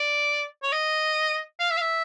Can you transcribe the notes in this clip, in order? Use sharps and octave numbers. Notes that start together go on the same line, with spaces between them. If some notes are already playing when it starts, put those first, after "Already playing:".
Already playing: D5
C#5
D#5
F5
E5
F5
E5